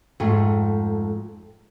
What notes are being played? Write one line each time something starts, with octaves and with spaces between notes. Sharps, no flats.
F2 G#2 A3